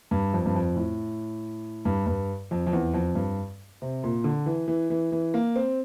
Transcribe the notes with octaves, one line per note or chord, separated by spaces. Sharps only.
G2
F2
G2
F2
A2
G2
G2
F2
F2
E2
F2
G2
C3
A#2
D3
E3
E3
E3
E3
A#3
C4